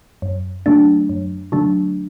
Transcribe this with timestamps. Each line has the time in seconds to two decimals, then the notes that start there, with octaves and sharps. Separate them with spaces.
0.22 F#2
0.66 D3 F#3 A3 D4
1.09 F#2
1.52 D3 F#3 A3 D4